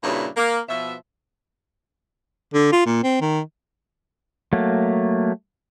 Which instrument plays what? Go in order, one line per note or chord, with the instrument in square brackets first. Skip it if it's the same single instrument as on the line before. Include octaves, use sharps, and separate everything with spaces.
[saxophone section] G2 A#2 C#3 D4 E4 F#4
A#3
B2 F3 E5
[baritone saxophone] D3
F4
A#2
C4
D#3
[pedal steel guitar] F#3 A3 A#3